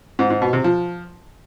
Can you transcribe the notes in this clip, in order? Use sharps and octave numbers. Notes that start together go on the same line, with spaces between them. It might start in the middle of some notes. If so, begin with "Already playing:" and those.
G#2
G#2
B2
C3
F3